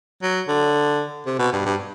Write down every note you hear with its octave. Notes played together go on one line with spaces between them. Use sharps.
F#3
D3
C3
B2
G2
G2